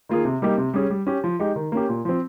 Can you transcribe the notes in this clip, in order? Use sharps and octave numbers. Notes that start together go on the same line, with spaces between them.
D#3 A#3 F4 G#4
C3
G3 A#3 D#4 G4
C3
G3 C#4 G#4
G3
C#4 G4
F3
G#3 D#4 G4
D#3
A#3 C#4 G4
A#2
F3 C4